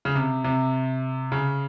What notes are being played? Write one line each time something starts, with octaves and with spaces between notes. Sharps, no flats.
C#3
C3
C3
C#3